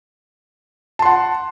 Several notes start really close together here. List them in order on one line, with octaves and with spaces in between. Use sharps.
A5 C6 F#5